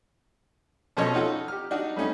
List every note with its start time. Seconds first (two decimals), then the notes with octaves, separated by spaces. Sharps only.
0.97 B2 F3 C#4 A4 C#5 D#5
1.14 D#4 F4 F#4 A4
1.48 G4 F6
1.71 D4 D#4 F#4
1.96 G3 A3 C#4 D#4